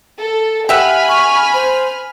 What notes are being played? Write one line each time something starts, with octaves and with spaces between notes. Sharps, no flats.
A4
G4 E5 F#5 G#5 B5 F6
C#6
C5